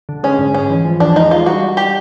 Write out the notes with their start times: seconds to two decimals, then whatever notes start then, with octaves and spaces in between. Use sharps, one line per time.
0.09 D3
0.23 G#3 C#4
0.38 G#2
0.54 G#3 C#4
0.70 E3
0.85 F3
1.00 E2 D4
1.15 G#3 D#4
1.31 G#3 F4
1.46 G3 F#4
1.62 G3
1.77 G3 G4